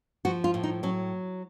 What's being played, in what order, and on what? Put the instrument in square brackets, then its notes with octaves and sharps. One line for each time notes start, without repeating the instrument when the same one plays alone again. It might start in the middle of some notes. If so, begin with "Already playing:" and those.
[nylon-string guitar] F3 F#4
F4
A2
D#4
F#3 C#4